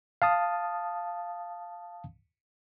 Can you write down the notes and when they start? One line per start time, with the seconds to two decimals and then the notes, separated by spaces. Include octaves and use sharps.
0.22 F5 A5 D#6